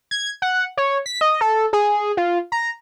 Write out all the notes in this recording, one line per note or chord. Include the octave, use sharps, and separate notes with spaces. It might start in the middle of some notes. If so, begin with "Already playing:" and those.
G#6
F#5
C#5
B6
D#5
A4
G#4
F4
A#5